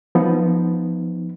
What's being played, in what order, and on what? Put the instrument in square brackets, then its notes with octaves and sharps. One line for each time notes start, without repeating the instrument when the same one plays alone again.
[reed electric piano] F3 B3 D#4